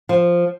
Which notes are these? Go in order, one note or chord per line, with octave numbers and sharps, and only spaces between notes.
F3